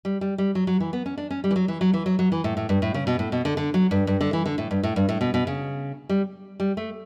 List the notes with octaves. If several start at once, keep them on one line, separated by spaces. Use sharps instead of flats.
G3
G3
G3
F#3
F#3
E3
B3
C#4
D4
C#4
G3
E3
F#3
E3
F#3
E3
F#3
F#3
E3
A2
A2
G2
A2
C#3
B2
A2
B2
D3
D3
F#3
G2
G2
D3
E3
D3
A2
G2
A2
G2
A2
B2
B2
C#3
G3
G3
A3